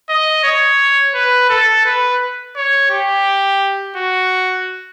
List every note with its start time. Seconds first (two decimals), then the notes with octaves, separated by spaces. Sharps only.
0.09 D#5
0.44 C#5
1.15 B4
1.49 A4
1.85 B4
2.56 C#5
2.90 G4
3.96 F#4